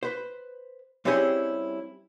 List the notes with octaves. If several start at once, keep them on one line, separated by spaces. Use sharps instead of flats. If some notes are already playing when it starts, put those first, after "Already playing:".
B4 C5
G3 C4 C#4 E4 G4 G#4